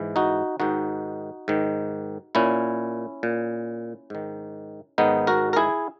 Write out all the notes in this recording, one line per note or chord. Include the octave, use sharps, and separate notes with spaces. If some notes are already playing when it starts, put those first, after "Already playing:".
Already playing: G#2 E3
D#4 F#4
G#2 D#3 D#4 F#4
G#2 D#3
A#2 C#4 E4
A#2
G#2 D#3
G#2 D#3 B3 D#4
F#4 A#4
A#4
E4 G#4